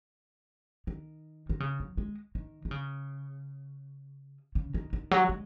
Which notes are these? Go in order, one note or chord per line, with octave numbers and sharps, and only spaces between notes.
D#3
D#3
C#3
F#3
G#3
D#3
D#3
C#3
C#3
D#3
D#3
F#3
G#3